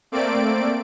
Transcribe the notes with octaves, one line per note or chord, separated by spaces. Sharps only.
A3 A#3 C4 D5 D7